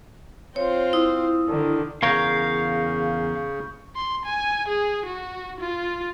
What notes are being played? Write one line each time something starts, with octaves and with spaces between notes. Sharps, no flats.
C4 F4 C5 C#5
E4 D#6
D3 D#3
E2 C#3 A#4 C#5 F5 C#6 G6
C6
G#5
G#4
F#4
F4